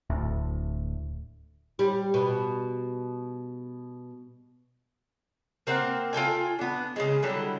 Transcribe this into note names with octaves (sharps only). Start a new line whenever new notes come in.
D1 D2 A2
G3
B2
A#3 C4 A#4 F#5
F4 A4 G5 G#5
B3 D4
C#3 E3 G#3
D3 F#3 G3 E4